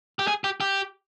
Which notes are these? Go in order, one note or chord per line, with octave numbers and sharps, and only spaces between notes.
G4
G#4
G4
G4